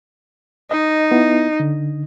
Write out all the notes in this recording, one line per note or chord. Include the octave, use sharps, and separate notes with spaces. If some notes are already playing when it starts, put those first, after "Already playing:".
D#4 D#5
B3 E4
D3